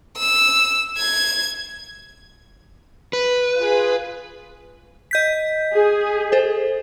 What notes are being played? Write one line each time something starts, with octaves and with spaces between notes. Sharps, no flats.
E6
G#6
B4
F4 G#4
D#5 G6 B6
G#4
A4 C5